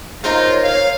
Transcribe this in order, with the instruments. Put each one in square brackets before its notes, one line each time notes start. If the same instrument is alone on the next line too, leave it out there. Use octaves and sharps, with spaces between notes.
[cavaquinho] D#4 A#4 C5 [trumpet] F4 [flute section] C#5
[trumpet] F5